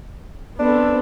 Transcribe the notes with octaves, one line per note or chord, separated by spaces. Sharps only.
B3 C4 D4 A4